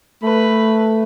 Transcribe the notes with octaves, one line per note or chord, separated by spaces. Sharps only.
A3 B4